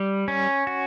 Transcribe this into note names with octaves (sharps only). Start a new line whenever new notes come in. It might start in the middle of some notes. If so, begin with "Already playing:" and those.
Already playing: G3
C#4
F#4